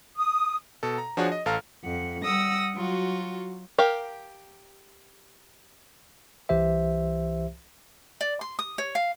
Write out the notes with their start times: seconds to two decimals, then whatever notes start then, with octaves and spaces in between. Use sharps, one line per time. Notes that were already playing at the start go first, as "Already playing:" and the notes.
0.16 D#6
0.83 B2 A4
0.98 A#5
1.17 F3 D4 F#4 G#4 C#5
1.32 D#5
1.46 A1 A4 F5 A#5 F6
1.83 F2 F#5
2.23 G3 F#5 D#6 E6 A#6
2.74 F#3 F4 F#4
3.78 G4 A#4 F5
6.49 C2 E3 G4 C5 E5
8.21 D5
8.41 C6
8.59 D#6
8.78 C#5
8.95 F5